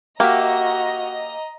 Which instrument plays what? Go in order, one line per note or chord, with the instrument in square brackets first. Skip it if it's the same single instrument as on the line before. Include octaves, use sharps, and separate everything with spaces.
[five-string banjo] A#3 [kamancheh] F#4 [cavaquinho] G4 E5 [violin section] D#5 A#5